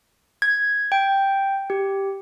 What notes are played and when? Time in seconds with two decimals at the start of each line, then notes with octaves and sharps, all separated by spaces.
0.42 G#6
0.92 G5
1.70 G4